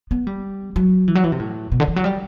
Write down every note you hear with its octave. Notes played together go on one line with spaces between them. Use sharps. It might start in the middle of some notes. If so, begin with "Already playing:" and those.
B3
G3
F#3
E3
F#3
E3
C3
A2
B2
D3
E3
F#3
G3